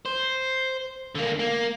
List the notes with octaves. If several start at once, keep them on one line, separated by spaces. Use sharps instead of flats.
C5
D3 A#3
A#3